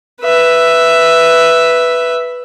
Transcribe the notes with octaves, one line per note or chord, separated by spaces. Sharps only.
B4 E5